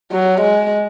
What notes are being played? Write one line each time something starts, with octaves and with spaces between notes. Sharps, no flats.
F#3
G#3